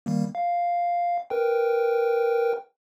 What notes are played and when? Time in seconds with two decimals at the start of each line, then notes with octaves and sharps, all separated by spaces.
0.06 D#3 G3 A#3
0.35 F5
1.30 A#4 B4 G5